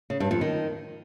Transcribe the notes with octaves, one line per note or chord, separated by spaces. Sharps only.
C#3
G2
F2
D#3